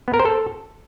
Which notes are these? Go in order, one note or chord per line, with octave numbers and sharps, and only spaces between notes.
B3
A#4
C5
A4